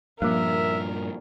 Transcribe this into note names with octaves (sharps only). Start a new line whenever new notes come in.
G2 A#2 F3 A#3 A#4 E5